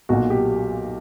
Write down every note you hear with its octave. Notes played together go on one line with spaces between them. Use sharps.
B1 A#2 F#4
G4